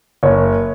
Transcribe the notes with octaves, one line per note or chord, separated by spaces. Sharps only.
F#1 C#5